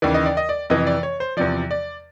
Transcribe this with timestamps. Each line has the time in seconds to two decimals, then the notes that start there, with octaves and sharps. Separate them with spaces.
0.02 D#2 C#3 E3 D5
0.14 D#5
0.26 D5
0.37 D#5
0.49 D5
0.70 F2 C3 E3 D#5
0.87 D5
1.03 C#5
1.20 C5
1.37 E2 C3 F3 D5
1.71 D5